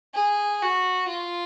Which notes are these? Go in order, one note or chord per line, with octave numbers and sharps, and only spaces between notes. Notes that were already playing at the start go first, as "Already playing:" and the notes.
G#4
F#4
F4